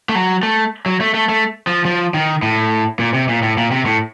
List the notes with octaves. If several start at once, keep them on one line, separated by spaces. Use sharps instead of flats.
A3
F#3
A3
F#3
A3
A3
A3
F3
F3
D#3
A2
A#2
C3
A#2
A2
A#2
C3
A2